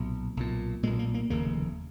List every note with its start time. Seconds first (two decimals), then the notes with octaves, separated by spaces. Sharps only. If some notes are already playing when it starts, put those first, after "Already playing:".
Already playing: B1 A#2
0.37 B1 A#2
0.83 A#2 G#3
0.87 B1
0.99 A#3
1.14 A#3
1.30 F1 D#2 C#3 A#3